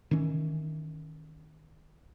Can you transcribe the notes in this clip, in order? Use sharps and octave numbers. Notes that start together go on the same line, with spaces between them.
D#3 E3 C#4